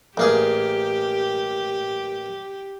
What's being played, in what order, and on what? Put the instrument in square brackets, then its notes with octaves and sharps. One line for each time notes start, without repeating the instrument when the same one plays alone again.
[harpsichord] A1 A#3 G#4 [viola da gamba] G4